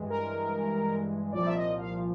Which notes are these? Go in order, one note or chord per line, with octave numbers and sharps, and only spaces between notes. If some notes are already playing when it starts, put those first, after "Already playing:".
Already playing: G2 E3 G#3
A#4
C2 A#2 F3 D5
E5
D#5
F5